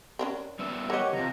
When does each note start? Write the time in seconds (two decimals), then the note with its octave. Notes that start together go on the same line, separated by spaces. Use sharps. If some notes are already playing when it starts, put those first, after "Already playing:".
0.19 C#4 D4 A#4
0.59 G3 B3 E5
0.90 G4 A#4 C#5 D#5 F#5
1.13 C3 D#3 F3 A#5